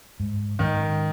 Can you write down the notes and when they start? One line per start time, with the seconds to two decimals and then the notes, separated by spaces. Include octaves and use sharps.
0.20 G#2
0.59 G#2 D#3